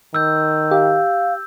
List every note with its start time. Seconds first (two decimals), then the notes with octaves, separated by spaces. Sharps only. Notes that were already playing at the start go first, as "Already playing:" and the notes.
0.14 D#3 E6 G6
0.71 G4 F5